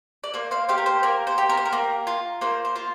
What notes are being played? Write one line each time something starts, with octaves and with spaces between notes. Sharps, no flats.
D5
A#3 C5
C5 F5
G4 C5 F5
A#4
C5
A#3 A#4
C5
G4
A#4
C5
A#4
A#3
F4
A#3 C5
C5
F4